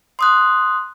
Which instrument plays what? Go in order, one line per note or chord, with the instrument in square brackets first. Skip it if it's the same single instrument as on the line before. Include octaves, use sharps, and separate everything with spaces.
[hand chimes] C6 D#6 F#6